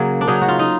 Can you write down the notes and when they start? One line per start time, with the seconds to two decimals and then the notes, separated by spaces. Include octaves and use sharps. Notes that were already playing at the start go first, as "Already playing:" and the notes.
Already playing: C#3 F#3 A#3
0.21 D4
0.28 C#3 F#3 D#4
0.42 F#4
0.48 F4
0.59 D#4